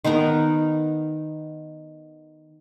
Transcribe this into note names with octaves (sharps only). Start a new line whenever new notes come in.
D#3 B3 D#4 A#4